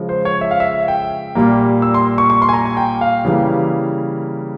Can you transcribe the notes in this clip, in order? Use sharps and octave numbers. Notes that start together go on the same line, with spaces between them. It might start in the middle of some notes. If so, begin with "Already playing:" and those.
Already playing: C#3 F3 G#3
C5
C#5
E5
F5
E5
G5
A#2 G3 A#3
E6
C6
C#6
C#6
C6
G#5
A#5
G#5
G5
F5
C#3 E3 G3 A#3